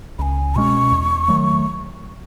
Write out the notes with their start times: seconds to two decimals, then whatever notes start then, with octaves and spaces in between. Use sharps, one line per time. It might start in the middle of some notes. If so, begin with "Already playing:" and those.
0.19 C#2 G#5 B5
0.55 B2 G#3 C#4 C#6
0.92 E2
1.28 D#3 F#3 A3